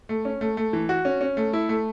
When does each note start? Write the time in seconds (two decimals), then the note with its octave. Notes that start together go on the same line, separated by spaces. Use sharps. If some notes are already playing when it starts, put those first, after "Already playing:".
0.09 A3
0.25 C#4
0.41 A3
0.57 A3
0.73 E3
0.89 F#4
1.05 C#4
1.21 C#4
1.37 A3
1.53 E4
1.69 A3